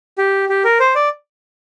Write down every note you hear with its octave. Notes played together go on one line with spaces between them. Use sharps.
G4
G4
A#4
C5
D5